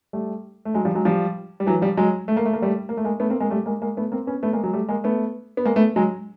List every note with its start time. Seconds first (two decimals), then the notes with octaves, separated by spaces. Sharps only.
0.13 G3 A3
0.65 A3
0.74 F#3 G#3
0.85 F3 G3
0.95 F#3 G#3
1.05 F3 G3
1.60 G3
1.67 E3 F#3
1.82 F3 G3
1.97 F#3 G#3
2.28 A3
2.37 A#3
2.46 A3
2.53 A#3
2.62 G3 A3
2.89 A#3
2.97 A3
3.04 G#3 A#3
3.20 A3 B3
3.30 A#3 C4
3.40 G#3 A#3
3.50 G3 A3
3.66 G#3 A#3
3.81 G#3 A#3
3.97 A3 B3
4.12 A#3 C4
4.27 B3 C#4
4.43 A3 B3
4.53 G#3 A#3
4.64 F#3 G#3
4.73 G3 A3
4.88 G#3 A#3
5.04 A3 B3
5.57 B3
5.65 G#3 A#3
5.76 A3 B3
5.96 F#3 G#3